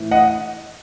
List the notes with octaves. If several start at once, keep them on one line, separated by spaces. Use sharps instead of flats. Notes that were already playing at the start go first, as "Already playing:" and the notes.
Already playing: A2 E3
D#5 F#5